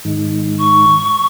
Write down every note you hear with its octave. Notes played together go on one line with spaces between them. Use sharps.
G#2 D#3
C#6